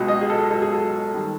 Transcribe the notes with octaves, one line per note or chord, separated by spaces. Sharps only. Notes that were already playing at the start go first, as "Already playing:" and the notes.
Already playing: C#2 B2 F#3
D#5
G#4
A4
C#2 B2 F#3 A4
G#4
A4
D#3 G3